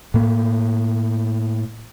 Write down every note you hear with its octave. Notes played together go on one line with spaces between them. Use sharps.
A2 A#3